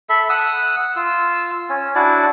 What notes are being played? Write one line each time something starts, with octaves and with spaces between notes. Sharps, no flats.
A4 E5 B5
F#5 D#6 E6
F4 E6
C#4
D4 E4 F#4 D5